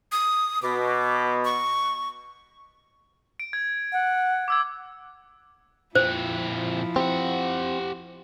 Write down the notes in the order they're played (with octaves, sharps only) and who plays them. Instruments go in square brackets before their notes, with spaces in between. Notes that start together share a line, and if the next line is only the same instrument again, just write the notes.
[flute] D#6
[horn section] B2 [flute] D6
[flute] C#6
[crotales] D7
G#6
[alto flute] F#5
[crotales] D6 E6 G#6
[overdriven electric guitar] A#2 C4 [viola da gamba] F3 E4 [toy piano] C5
[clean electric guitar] C4 [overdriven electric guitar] G4 F#5